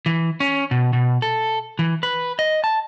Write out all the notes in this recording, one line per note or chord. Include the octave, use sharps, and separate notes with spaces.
E3
C#4
B2
B2
A4
E3
B4
D#5
A5